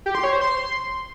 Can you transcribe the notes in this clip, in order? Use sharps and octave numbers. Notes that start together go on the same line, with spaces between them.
G4
C6
C#5
C5
C6